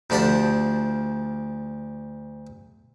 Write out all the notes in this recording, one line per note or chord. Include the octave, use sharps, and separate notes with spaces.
D2 F3 D4 G4 F#5 A5